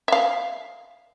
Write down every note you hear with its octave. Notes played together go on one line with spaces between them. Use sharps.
E5 F5